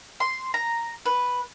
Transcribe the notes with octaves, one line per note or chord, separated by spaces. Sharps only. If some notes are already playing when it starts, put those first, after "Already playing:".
C6
A#5
B4